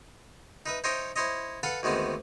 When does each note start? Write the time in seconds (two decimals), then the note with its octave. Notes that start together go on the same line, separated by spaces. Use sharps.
0.66 D#4 B4 E5
0.84 D#4 C5 C#5 D#5 E5 G5
1.16 E4 C5 C#5 D#5
1.63 A4 B4 F5 F#5 A5
1.83 D2 D#3 G#3 B3 C4